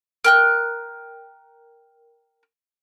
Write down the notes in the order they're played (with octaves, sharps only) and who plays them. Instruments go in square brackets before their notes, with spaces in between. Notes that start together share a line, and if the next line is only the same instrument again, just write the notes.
[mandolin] A#4 G5 F#6